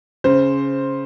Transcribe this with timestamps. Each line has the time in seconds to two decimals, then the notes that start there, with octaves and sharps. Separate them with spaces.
0.24 C#3 C5